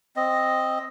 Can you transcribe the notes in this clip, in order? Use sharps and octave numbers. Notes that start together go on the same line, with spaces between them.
C4 D#5